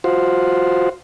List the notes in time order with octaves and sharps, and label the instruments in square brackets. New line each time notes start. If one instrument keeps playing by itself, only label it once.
[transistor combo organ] F4 F#4 C5